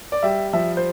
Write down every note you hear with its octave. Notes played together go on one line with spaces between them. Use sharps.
D5
G3 E5
F3 E5
C5